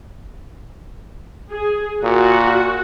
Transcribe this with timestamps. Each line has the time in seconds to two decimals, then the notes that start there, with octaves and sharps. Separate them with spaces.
1.50 G#4
2.03 A#2 F#4